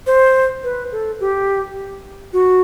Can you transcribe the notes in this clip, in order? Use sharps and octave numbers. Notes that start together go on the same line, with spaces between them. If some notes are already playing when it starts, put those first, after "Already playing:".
C5
B4
A4
G4
F#4